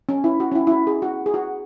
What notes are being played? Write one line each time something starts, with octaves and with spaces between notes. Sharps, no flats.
C#4
E4
F#4
C#4
E4
E4
F#4
G#4
F#4
G#4
F#4